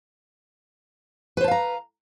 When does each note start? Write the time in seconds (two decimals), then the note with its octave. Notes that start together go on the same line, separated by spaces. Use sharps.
1.37 B4
1.41 C5
1.44 A5
1.48 F5
1.51 A#5